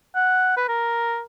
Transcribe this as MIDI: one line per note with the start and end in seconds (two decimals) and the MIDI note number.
0.16 0.55 78
0.57 0.64 71
0.68 1.21 70